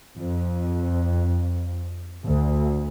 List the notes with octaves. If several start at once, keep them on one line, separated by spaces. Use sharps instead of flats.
F2
D2